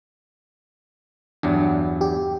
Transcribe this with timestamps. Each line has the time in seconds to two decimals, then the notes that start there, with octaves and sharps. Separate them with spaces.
1.43 E2 G2 F#3 D4
2.01 G4